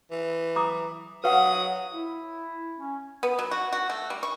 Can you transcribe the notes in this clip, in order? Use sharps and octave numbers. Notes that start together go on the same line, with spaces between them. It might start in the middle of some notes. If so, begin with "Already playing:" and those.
E3
A#5 D6 D#6
F#3 B4 F5 F#5 D#6
E4
C#4
B3
F#3
F#4
F#4
A3
G3
C#6